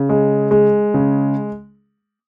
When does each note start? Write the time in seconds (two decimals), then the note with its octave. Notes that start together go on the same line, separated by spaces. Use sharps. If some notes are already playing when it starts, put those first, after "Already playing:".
Already playing: C#3
0.09 G#3
0.51 G#3
0.94 C#3